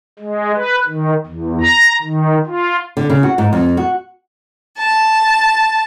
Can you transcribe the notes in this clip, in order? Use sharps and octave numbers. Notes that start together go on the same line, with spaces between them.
G#3
B4
D#3
E2
A#5
D#3
F4
D3
C#3
F#4
G#2
F2
F#4
A5